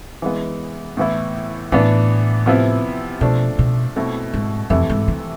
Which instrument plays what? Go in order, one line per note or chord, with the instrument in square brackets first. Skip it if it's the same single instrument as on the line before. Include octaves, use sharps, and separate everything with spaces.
[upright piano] E3 G#3 B3
A2 E3 B3 E4
[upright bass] A2 [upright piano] E3 B3 D4
[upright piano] C3 F3 B3 E4
[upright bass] B2 [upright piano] F3 A3 D4
[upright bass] B2
[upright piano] B2 A3 C4 E4
[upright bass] G#2
[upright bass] F2 [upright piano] C3 E3 A3 E4
[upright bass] G#2
E3